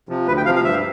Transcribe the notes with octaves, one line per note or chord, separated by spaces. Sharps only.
C3 F3
D2 B4
G5
C3 F3 F5
F5
G2 E5